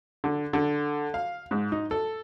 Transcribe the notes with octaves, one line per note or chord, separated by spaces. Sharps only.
D3
D3
F5
G#2
D#4
A4